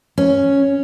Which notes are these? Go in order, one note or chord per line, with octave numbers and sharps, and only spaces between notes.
C#4